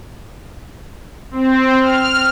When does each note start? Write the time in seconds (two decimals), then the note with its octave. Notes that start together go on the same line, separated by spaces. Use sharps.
1.31 C4
1.81 F6